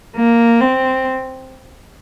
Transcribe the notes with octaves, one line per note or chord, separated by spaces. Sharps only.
A#3
C4